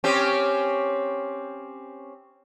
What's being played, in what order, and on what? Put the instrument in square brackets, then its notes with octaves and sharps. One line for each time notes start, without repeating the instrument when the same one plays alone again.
[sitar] C4 C#4 G4